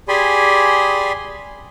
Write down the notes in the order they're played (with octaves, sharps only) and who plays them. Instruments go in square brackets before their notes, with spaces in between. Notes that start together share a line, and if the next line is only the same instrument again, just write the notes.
[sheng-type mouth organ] G4 G#4 D5 G#5 B5 C6